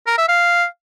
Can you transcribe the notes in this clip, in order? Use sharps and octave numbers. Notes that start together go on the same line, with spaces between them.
A#4
E5
F5